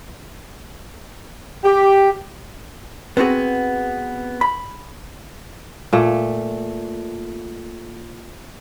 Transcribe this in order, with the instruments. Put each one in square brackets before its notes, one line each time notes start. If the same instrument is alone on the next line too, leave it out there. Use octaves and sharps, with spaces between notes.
[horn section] G4
[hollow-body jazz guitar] B3 C4 F#4 G#4
B5
[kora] A#2 A3